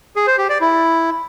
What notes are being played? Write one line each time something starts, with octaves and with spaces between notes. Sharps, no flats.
G#4
C5
G4
D5
E4